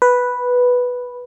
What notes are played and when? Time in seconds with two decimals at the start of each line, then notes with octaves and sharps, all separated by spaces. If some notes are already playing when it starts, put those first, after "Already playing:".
0.02 B4